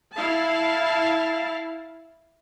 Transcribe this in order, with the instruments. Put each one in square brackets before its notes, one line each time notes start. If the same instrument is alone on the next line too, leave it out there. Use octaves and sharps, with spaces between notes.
[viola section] E4 F5 A5